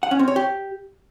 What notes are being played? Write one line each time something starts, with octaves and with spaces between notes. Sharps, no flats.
F#5
C#4
C4
C#5
G4